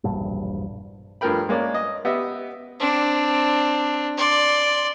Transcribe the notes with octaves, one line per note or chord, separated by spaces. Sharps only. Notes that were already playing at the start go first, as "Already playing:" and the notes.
E1 A#1 G2
G2 F3 A3 A#4 G5 B5
G#3 A#3 C#4 D5
D#5
B3 G4 D#5 E5
C4 D4
D5 C6